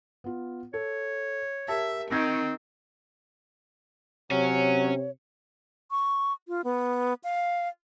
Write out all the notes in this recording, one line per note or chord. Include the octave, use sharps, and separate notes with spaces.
B3 F4
A4 C#5
G4 A#4 E5 A5
D#3 C4 G6 G#6 A#6
C3 F#3 C#4 C#5
C#6
F4
B3
F5